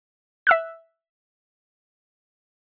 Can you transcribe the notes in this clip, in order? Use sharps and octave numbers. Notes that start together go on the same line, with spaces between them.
E5 E6 F#6